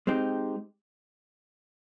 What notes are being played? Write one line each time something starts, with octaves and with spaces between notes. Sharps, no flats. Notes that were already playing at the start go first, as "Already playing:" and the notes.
G#3 C4 D#4 G4